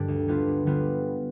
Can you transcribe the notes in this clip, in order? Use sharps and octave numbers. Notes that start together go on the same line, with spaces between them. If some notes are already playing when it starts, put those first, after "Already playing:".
Already playing: G2 D3 G3 D4
D2
D3 G3 B3 F4
D2
D3 G3 B3 F4